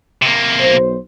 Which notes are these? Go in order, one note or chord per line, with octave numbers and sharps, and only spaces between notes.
C3 A#3
B1 C5